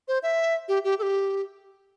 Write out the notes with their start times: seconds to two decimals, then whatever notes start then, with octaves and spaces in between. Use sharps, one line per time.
0.08 C5
0.23 E5
0.68 G4
0.84 G4
0.99 A4
1.02 G4